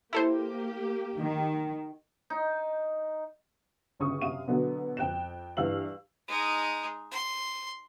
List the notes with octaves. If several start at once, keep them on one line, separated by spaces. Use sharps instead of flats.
A#3 E4 G4 A4 C5
D#3
D#4
G1 C#3 C#6 D#6
F#2 C3 F5 D#7
B2 D3 F#3 B3
F2 G5 F#6 E7
G2 E3 F5 E6 F#7
G#3 D#4
C6